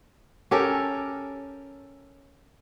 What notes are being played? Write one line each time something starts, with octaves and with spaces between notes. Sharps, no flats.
C#4 G4 A4 A#4